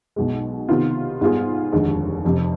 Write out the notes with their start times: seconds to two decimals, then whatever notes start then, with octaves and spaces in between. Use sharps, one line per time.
0.16 B1 B2 G#3
0.69 C3 D#3 B3 F4
1.21 G#2 G3 B3 F4 G#4
1.72 F1 D#2 D3 G#3
2.24 F1 F2 C3